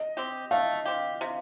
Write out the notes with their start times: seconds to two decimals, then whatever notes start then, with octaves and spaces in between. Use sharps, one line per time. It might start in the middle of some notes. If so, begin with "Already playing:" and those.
Already playing: D#5
0.17 C4 G4
0.51 A3 F5
0.85 C4 G4
1.21 C3